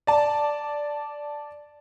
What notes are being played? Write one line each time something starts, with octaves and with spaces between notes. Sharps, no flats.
D5 A5